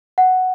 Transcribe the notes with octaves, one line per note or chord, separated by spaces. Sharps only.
F#5